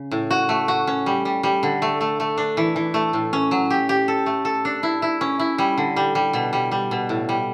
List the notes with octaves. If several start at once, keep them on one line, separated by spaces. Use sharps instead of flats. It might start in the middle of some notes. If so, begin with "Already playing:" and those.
Already playing: C#3
A2
F#4
A3
F#4
C#4
G3
G3
G3
D3
A3
A3
A3
D4
E3
E3
A3
A2
C#4
F#3
G4
G4
A4
A3
A4
D4
E4
E4
C#4
E4
G3
D3
G3
G3
B2
G3
G3
B2
A2
G3